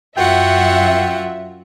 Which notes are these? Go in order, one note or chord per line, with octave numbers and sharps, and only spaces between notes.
F#2 F4 F#4 E5 F#5 G5